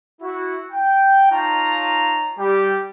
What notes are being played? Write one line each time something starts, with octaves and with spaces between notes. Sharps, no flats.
E4 F#4
G5
D#4 F4 C#5 F5 A5 A#5
G3 G4